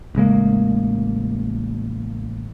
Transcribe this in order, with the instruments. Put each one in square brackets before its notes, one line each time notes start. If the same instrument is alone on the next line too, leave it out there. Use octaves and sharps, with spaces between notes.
[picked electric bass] A1 C#3 G#3 A#3